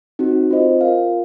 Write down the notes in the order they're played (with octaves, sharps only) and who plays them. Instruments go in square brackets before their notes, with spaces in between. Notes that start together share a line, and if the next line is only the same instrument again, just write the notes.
[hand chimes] C4 D#4 F#4
C4 F4 C5 D#5
F4 A#4 F5